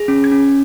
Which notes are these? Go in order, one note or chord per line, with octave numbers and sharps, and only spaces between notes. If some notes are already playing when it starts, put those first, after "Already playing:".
Already playing: G#4
C#4
G#6
C#4